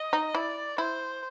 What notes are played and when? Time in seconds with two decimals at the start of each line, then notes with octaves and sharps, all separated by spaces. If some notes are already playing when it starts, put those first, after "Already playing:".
Already playing: D#5
0.13 D#4
0.35 E4 D5
0.78 E4 C5